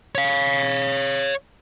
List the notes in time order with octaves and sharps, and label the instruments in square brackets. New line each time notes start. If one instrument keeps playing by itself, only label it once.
[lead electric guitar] C#5 F5